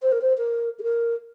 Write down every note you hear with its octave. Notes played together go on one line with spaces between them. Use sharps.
C5
A#4
C5
A#4
G#4
A#4